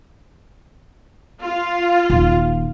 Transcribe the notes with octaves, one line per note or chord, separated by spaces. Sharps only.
F4
D#1 D#3